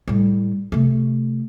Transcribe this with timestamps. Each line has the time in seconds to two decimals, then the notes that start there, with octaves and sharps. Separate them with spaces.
0.08 A2 G3
0.72 C3 A3